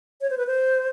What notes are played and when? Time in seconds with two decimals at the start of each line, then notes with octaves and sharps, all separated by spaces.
0.21 C#5
0.30 C5
0.38 B4
0.47 C5